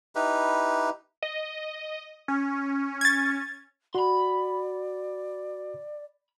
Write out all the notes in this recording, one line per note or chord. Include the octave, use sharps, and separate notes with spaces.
D#4 E4 G4 B4
D#5
C#4
G#6 A6
F#4 D5 B5 C6